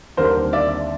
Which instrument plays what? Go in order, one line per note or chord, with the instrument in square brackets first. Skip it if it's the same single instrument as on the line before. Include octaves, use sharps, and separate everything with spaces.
[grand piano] D#2 D3 G3 C4 A#4 C5
D5 E5